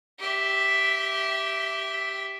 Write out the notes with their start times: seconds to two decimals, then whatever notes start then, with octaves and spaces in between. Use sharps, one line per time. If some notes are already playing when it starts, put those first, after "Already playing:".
0.20 G4 E5